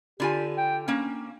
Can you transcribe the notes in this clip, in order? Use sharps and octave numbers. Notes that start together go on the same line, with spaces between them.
D3 F4 G4 G#5
G5
A#3 C#4 D4